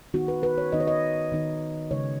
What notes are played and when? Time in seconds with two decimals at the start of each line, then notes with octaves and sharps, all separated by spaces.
0.14 D#3 B3 D#4 F#4
0.28 B4
0.43 B4
0.58 C#5
0.72 D#3 B3 D#4 D#5
0.80 C#5
0.87 D#5
1.32 D#3 B3 D#4
1.91 C#3 G#3 D#4 C#5